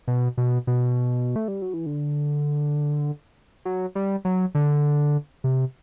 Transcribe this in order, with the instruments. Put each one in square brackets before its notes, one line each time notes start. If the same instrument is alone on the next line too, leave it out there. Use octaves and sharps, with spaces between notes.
[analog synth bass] B2
B2
B2
A3
G3
F#3
E3
D3
F#3
G3
F#3
D3
C3